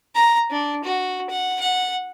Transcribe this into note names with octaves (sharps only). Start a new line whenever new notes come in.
A#5
D4
F#4
F#5
F#5